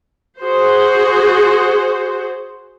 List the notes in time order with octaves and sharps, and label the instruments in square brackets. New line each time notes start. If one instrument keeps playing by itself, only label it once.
[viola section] F#4 G#4 C5